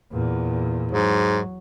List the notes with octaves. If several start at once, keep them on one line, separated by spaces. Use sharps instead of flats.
E2 A#2
G#2 F#3